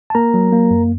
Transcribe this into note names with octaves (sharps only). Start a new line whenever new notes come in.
A5
A#3 A#4 A#5
F#3
A#3
F#2